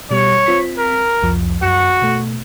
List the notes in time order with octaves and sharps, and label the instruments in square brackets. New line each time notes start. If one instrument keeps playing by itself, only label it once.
[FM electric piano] B2 G3 [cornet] C#5
[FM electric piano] C4 F4 B6
[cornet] A#4
[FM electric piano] C2 F2 F3
[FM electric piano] F#2 C#7 [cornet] F#4
[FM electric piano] B2 A3